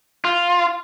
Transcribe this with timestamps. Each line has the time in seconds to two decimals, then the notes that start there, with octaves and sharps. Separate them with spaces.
0.25 F4